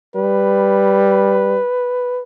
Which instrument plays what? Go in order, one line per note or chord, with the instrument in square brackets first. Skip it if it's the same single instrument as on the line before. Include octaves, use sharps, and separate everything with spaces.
[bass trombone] G3 [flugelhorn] B4